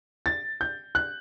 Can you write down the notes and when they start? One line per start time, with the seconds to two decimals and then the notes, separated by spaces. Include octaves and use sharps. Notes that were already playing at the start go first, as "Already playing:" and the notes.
0.26 A6
0.61 G6
0.95 F#6